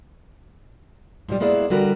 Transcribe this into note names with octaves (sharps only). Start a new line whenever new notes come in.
G#2 F3 G3
G#3 A#3 B3 E4 G#4 D5
D3 G3 F#4 A#4 B4